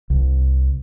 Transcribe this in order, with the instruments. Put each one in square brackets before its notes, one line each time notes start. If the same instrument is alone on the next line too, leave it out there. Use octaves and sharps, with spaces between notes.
[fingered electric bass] C2